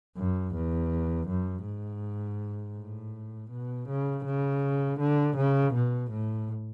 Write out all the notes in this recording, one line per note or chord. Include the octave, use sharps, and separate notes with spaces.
F#2
E2
F#2
G#2
A2
B2
C#3
C#3
D3
C#3
B2
A2